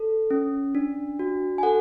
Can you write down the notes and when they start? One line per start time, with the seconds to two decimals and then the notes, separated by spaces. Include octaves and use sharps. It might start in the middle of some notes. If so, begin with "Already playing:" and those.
Already playing: A4
0.31 C#4
0.75 D4
1.19 F#4
1.58 G#5
1.63 A4 F#5